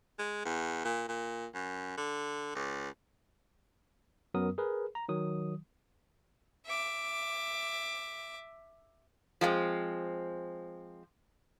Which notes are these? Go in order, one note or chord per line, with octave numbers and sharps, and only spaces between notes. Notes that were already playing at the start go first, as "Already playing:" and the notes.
G#3
E2
A#2
A#2
F#2
D3
C#2
F#2 F#3 B3 A#4 D#6
G#4 A#4 B4
A#5
D#3 F#3 D#6
E5 D6
F3 G#3 B3 C4